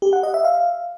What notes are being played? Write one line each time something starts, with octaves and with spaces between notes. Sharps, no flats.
G4
F#5
D#5
E5
F5